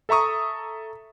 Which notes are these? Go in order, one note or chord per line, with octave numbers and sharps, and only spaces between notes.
A4 E5 A#5 C#6 D#6